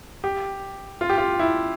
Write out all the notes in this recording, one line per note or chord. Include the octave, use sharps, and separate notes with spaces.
G4
F4
G4
F4
E4